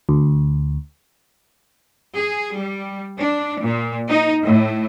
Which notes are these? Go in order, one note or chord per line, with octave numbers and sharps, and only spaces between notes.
D2
G#4
G3
D4
A#2
D#4
A2